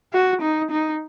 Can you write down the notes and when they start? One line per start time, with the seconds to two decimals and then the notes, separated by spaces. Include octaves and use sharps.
0.13 F#4
0.42 D#4
0.71 D#4